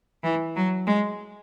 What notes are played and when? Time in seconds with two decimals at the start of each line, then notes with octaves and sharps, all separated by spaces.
0.24 E3
0.56 F#3
0.87 G#3